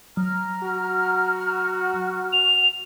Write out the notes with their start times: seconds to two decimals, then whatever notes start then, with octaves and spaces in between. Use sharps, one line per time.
0.17 F#3 A#5 F6
0.63 F#4
2.33 F7